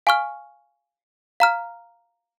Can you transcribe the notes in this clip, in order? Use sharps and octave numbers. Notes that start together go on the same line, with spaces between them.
F5 G#5 C#6 F6
F5 A#5 F6